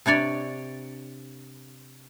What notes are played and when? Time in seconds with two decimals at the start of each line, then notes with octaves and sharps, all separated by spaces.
0.06 C3 D4 C#5 D5